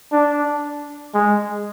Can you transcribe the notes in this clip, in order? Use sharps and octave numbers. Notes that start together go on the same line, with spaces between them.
D4
G#3